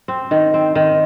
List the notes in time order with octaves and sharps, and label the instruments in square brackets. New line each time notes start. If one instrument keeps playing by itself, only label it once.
[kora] C4
D#3
C4
D#3